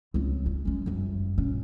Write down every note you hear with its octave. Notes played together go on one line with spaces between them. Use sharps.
C#2 C4
G#3
G#3 C#4
G1 F#2
A#1 C#4